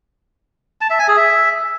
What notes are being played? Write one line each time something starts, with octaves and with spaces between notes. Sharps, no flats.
A5
E5
G#5
G#4
E5